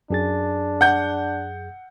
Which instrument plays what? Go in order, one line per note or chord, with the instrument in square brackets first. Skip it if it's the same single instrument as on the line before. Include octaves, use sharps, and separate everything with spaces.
[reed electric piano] F#2 G#4 A6 [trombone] D4
[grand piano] F#5 G6